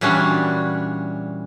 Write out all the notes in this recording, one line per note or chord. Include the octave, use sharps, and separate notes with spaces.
A#2 E3 G3 C#4 D4 F#4